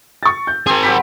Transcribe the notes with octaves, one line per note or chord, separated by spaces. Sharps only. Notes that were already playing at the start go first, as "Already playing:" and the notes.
C#6 A6
G6
C4 G#4 A#4
F#3 G4 B5